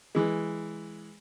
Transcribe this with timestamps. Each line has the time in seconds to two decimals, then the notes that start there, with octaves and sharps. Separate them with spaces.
0.15 E3 G#3